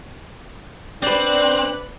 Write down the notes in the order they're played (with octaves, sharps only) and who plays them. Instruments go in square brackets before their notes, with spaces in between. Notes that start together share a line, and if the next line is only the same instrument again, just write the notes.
[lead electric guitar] C4 [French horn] D4 [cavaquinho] B4 D5 [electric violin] F#5 F#6